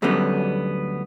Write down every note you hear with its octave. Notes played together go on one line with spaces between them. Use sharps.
D2 F#3 G3 A3 B3 C#4